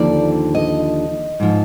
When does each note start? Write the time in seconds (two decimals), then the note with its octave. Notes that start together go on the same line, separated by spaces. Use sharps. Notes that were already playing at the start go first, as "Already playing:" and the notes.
Already playing: D#2 D3 F3 D5
0.55 D#5
1.40 G#2 F3